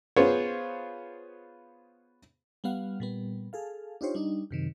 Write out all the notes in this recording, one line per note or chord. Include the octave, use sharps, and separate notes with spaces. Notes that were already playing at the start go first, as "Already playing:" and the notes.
B3 F4 G#4 C5 C#5
G3 B3 F5 F#5
A#2 G3 B3
G#4 A4 F5
D4 D#4 F4 G4 C5 C#5
G3 D4 D#4
F#2 C3 D#3